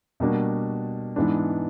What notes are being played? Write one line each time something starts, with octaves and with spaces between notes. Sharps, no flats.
B2 G3 A#3 D4 F#4
G#2 E3 G#3 B3 D4